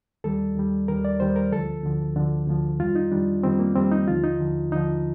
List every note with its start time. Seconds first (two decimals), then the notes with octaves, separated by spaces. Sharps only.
0.24 D#2 D#3 G3 A4
0.56 D#2 D#3 G3
0.88 D#2 D#3 G3 A#4
1.05 D5
1.20 D#2 D#3 G3 C5
1.36 A#4
1.52 D2 D3 F3 A4
1.84 D2 D3 F3
2.16 D2 D3 F3
2.47 D2 D3 F3
2.80 F2 D#3 G3 F4
2.96 D#4
3.12 F2 D#3 G3 D4
3.43 F2 D#3 G3 C4
3.59 A#3
3.76 F2 D#3 G3 C4
3.91 D#4
4.07 D#2 D3 F3 F4
4.24 D#4
4.40 D#2 D3 F3
4.72 D#2 D3 F3 D#4